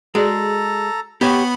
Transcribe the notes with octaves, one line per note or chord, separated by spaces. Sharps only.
G#3 F#4 G#4 A4 D5 A#5
B3 G4 C#5 B5